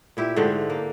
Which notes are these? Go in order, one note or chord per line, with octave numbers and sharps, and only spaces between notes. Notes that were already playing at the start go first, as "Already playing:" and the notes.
A#2 E4 G4 E5
G#2 D3 A3 G4
A#3